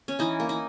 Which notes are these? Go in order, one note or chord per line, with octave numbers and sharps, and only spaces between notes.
C#4
E3 D#4
A#3
D#4